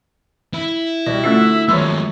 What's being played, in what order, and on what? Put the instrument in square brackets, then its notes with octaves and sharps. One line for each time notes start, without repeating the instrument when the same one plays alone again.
[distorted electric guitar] E4
[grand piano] B2 G3 [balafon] D5
[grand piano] D3 F#4 [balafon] A3 C#4 F4 [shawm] E5
[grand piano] F#2 F3 C#5 [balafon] D#3 B5 [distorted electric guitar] G#3 A#3